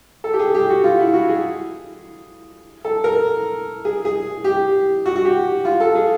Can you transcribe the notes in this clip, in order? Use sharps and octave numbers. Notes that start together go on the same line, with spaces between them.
A4
G4
G#4
G4
F#4
F4
E4
F#4
G#4
A4
A#4
G#4
G#4
G4
F#4
F#4
G4
F4
A4
G#4